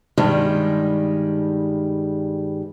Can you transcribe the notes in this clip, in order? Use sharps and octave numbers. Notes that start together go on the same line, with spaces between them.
G2 D#3 G3 G#3